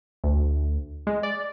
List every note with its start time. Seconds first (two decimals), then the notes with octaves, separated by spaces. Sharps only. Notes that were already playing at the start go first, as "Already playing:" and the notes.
0.24 D2
1.07 G#3
1.23 D5